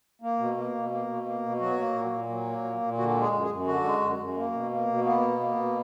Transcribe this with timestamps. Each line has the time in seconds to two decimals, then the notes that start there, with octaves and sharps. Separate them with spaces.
0.22 A#3
0.39 B2
0.57 A#3
0.74 B2
0.91 A#3
1.08 B2
1.25 A#3
1.42 B2
1.59 F#3 F#4
1.78 A#3
1.94 A#2
2.11 A#2
2.29 F#3
2.47 A#3
2.64 A#2
2.81 A#2
2.98 D3 F#4
3.15 G#3
3.21 G#4
3.33 F#2
3.43 G#4
3.50 F#2
3.67 D3 F#4
3.84 G#3
4.01 F#2
4.19 F#2
4.36 A#3
4.53 B2
4.71 A#3
4.88 B2
5.04 A#3 B3
5.22 B2
5.40 A#3
5.56 B2